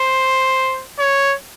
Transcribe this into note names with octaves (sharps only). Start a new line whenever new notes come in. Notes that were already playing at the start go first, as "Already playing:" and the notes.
Already playing: C5
C#5